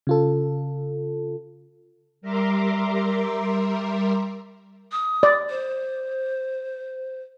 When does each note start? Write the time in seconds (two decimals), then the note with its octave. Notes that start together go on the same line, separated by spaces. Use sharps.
0.07 C#3 F4 A4
2.21 G3 A#4 E5 A#5 C6 D6
4.92 D#6
5.23 D5
5.50 C5